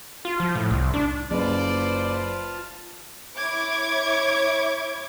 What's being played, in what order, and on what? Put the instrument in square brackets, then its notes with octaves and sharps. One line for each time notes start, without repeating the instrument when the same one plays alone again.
[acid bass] F4
F3
A2
C2
D4
[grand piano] F#1 [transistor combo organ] F4 A5 [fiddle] B4 C5 [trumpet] D5
[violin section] E4 C#5 D6 G#6